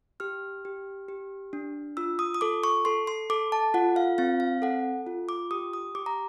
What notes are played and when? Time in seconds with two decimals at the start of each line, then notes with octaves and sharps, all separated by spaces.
0.20 G4 F6
0.65 G4
1.08 G4
1.53 D4
1.97 F4 E6
2.19 D#6
2.34 D#6
2.41 A4 D6
2.64 C#6
2.85 A4 C6
3.07 C6
3.30 A4 D6
3.52 A5
3.74 F4 F#5
3.96 F5
4.18 C4 F5
4.40 F5
4.62 A4 F#5
5.07 F4
5.29 D6
5.51 G4 D#6
5.73 D#6
5.95 G4 D6
6.06 A#5